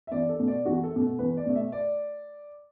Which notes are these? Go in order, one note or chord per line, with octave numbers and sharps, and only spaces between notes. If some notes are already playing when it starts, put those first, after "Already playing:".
E5
E2 D5
A4
B2 A3
D5
E2 F#4
A4
B2 A3
A4
E2 B4
D5
B2 A3
E5
D5